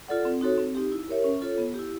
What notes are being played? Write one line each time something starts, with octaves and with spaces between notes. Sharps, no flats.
F4 A4 D5 F#5
C4
D#4 F#4 A4 C#5
C4
D#4 G4
E4
G4 A#4 C#5 E5
C#4
F4 A4 C#5
B3
E4 G4